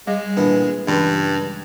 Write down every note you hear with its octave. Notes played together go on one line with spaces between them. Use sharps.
G3 G#3 D#5 F5
A#2 E3 B3 D4
C#2 G2 E3 D5